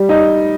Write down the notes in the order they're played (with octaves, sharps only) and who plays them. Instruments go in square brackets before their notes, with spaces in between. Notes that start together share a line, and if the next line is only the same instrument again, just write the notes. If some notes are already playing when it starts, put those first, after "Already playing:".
Already playing: [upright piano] G3
D#4